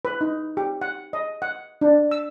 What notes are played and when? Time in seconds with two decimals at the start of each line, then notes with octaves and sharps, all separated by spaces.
0.05 B4
0.21 D#4
0.57 G4
0.81 F#5
1.13 D#5
1.42 F#5
1.81 D4
2.11 E6